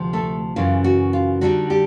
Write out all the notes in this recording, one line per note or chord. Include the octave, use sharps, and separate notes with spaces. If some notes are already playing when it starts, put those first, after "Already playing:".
Already playing: D2 C3 F3
A3 A4
F#2 C#3 E3 F4
F#4
F4
D3 G3 C4 D#4 F#4
G3 G4